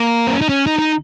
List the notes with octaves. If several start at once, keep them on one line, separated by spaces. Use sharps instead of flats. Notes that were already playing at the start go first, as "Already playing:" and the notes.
Already playing: A#3
C4
C#4
D#4
C#4
D#4
D#4